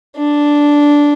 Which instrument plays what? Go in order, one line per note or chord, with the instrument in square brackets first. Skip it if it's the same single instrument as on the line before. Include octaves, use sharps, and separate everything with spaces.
[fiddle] D4